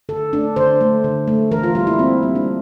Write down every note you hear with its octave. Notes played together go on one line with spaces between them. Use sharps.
D3 A4
A3 D4
D3 C5
A3
D3
A3
E3 A#4
F4
G3 A#3 F4
E4
E3 C4
G3 A#3
D4